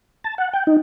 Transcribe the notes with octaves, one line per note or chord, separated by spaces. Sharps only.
A5
F#5
G5
D#4